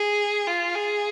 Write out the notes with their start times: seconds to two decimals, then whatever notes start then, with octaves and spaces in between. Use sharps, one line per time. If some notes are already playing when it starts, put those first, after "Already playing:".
Already playing: G#4
0.47 F4
0.75 G#4